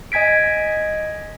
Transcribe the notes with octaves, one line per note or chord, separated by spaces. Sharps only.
D#5 G#5 G#6 B6 D7